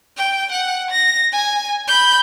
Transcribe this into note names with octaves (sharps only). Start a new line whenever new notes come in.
G5
F#5
A#6
G#5
B5 G6